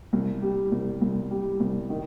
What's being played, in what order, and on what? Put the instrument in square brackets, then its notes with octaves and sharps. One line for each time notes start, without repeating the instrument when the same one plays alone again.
[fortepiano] C2
G3
C2
C2
G3
C2
D#3